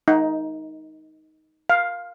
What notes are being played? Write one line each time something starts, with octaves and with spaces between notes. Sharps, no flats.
D#4
F5